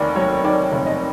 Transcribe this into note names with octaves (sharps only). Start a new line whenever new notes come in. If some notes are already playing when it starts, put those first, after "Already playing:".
Already playing: F1 D#2 D5
F#3 C#5
D#3 D5
F1
D#5